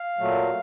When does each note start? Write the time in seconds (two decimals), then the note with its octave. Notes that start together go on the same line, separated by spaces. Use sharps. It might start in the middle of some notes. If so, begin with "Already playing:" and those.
Already playing: F5
0.18 A#2 F#3 A3